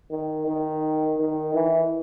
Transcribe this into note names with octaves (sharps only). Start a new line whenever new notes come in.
D#3
D#3
D#3
E3